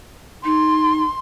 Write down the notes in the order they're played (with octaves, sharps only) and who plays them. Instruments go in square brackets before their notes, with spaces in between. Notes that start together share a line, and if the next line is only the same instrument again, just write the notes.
[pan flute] D#4 [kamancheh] C6